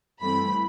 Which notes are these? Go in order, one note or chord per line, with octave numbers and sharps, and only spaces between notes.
G2 E3 A3 C4 B5